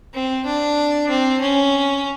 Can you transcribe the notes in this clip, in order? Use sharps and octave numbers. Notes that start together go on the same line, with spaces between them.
C4
D4
C4
C#4